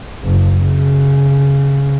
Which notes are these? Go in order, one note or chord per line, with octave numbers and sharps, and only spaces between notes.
F#1
C#3